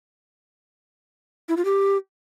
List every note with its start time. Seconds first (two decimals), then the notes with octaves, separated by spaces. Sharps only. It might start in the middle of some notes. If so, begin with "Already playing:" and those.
1.49 E4
1.57 F4
1.65 G4